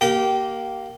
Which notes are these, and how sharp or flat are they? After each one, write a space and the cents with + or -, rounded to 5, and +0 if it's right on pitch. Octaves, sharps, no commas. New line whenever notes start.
A#3 +0 G4 -20 G5 -25